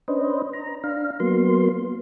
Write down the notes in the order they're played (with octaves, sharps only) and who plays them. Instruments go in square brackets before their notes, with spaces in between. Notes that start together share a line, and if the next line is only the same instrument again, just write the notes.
[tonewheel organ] C#4 D4 B4 C5 D#5
A#5
D4 F5
F#3 A#3 B3 C6